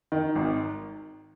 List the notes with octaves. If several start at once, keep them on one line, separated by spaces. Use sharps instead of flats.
D#3
G#1